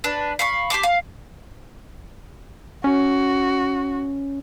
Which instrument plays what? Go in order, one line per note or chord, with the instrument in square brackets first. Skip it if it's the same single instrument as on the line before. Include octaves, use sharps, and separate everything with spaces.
[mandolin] D4 B4
F5 B5 C#6
G4 A5 C6 D6
F5
[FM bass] C#4 [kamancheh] F#4